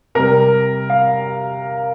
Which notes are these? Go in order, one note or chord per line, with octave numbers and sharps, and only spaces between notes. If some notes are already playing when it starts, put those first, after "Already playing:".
C3 G3 A#4
F5